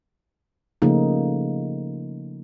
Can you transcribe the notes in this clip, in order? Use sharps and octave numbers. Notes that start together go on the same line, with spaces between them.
C#3 F3 A3 A#3 D#4